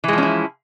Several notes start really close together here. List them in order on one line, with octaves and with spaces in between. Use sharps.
E3 G#3 F3 C#4 E4